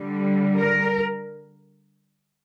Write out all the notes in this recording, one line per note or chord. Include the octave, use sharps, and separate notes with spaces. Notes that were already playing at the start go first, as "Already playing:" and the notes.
Already playing: D3 G3
A#4